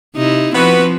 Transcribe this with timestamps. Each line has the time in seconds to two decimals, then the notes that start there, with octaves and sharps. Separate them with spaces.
0.15 C3 D#4 E4
0.55 F3 B3 C4 F#4 B4